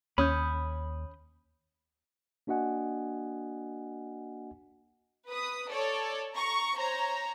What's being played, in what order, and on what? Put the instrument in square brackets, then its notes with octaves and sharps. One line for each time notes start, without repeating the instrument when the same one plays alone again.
[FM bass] D#2 [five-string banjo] C#4 [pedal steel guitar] B5 D#6 G6
[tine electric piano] A#3 D4 F#4 D#5 F#5 G#5
[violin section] B4 D#6
A4 C#5 D5
A#5 C#6
C5 C#5 A#5